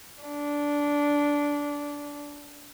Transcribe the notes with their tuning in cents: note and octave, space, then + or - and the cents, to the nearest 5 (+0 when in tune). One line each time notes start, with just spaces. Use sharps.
D4 -15